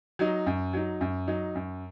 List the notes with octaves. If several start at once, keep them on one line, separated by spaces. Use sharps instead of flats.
F#3 D#4
F#2
F#3 D#4
F#2
F#3 D#4
F#2